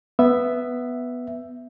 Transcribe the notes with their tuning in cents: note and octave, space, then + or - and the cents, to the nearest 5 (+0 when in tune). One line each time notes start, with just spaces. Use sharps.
B3 +0 E5 +5